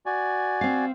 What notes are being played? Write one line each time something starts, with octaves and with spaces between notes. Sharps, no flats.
F#4 D5 G#5
C4 F5